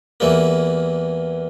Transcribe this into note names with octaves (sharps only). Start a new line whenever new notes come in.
E2 E3 G3 A#3